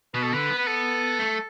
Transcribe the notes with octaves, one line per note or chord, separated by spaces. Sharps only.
B2 B4
A4
D3 B4
B3
B4
A4
A3